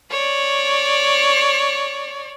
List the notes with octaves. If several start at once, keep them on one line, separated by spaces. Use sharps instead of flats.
C#5 D5